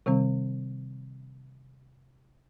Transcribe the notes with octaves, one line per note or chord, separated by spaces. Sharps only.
C3 D#3 G3 C4